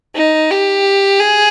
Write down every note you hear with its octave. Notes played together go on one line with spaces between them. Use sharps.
D#4
G4
G#4